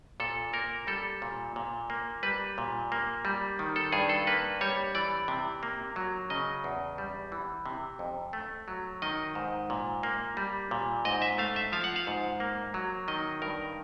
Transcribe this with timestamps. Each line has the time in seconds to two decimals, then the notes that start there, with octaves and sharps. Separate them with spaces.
0.20 A#2 A4
0.53 A#3 A#4
0.87 G3 A4
1.22 A#2
1.56 A#2
1.90 A#3
2.23 G3 B4
2.58 A#2
2.92 A#3
3.25 G3
3.59 D#3
3.76 A4
3.92 G2 G#4
4.09 A4
4.27 A#3 B4
4.61 G3 C#5
4.95 E3 D5
5.28 C3
5.63 A#3
5.96 F#3
6.30 C#3 D#5
6.64 E2
6.98 G3
7.32 E3
7.66 C3
7.99 F2
8.33 A3
8.68 F#3
9.02 D#3 D#5
9.35 G#2
9.70 A#2
10.03 A#3
10.37 G3
10.71 A#2
11.05 G#2 D#5
11.22 E5
11.38 A3 F5
11.56 E5
11.72 F3 F5
11.84 F#5
11.96 F5
12.07 G#2
12.40 A#3
12.74 F#3
13.08 D#3 D#5
13.42 G2 A#4